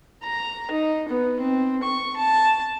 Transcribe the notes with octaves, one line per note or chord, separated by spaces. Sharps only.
A#5
D#4
B3
C4
C#6
A5